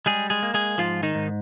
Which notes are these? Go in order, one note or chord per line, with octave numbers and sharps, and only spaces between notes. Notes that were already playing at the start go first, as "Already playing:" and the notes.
G3 G#3 G#4
G#3 G#4
A#3
G#3 G#4
G#2 F3 F4
D#3 D#4
G#2